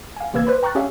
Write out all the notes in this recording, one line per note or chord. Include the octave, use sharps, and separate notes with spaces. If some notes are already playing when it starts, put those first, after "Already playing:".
F5 G#5
A1 C3 A#3 B4 E6 G#6
B4 C5 D5 B5
G5 A#5 C#6 F6 F#6 A6
C#4 G4 G#4 C#5 E5 F5